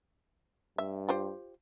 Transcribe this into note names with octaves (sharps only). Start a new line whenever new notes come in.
G2 E5
F4 G4 C5